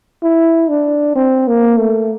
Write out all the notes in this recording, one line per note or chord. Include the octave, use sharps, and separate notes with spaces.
E4
D4
C4
A#3
A3